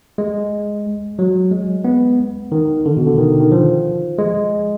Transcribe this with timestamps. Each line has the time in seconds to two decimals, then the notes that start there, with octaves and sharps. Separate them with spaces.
0.18 G#3
1.19 F#3
1.51 G#3
1.84 B3
2.52 D#3
2.86 D3
2.97 B2
3.07 D3
3.18 D#3
3.40 D#3
3.52 F3
4.18 G#3